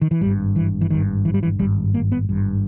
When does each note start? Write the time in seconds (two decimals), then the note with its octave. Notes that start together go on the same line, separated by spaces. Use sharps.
0.01 D#3
0.11 E3
0.21 G#1 G2 G3
0.56 E3
0.81 E3
0.90 G#1 G2 D#3
1.25 E3
1.34 G3
1.43 E3
1.59 G#1 G2 G3
1.94 A#3
2.12 B3
2.29 G#1 G2